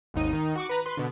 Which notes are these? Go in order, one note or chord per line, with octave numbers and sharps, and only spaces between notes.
G#1 D#2 D#4 D#7
D#3 D#4
F#4 C#6 D6
B4 A#5
B4 C6
B2 D3